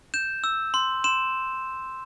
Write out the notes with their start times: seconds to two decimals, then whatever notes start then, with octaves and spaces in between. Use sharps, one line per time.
0.14 G6 E7
0.44 E6
0.74 C6
1.04 C6 E7